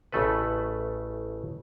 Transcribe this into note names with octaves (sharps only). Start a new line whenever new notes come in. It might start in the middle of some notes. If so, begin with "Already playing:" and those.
A1 C#3 A3 A4 B4